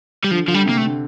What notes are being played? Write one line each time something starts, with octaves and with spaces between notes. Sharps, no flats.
G3
D3 F3
D3 F3
G3
C3 A#3
A3
D3